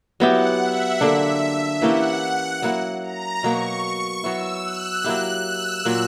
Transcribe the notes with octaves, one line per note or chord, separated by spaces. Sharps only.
F#3 B3 E4 G4 F#5
E5
D3 A#3 D4
E3 A#3 C#4 G4 F#5
F#3 A#3 E4
A#5
B2 F#3 A#3 C#6
F#3 B3 E4 E6
F#6
F#3 A#3 E4 G4
E6
A#2 F#3 A#3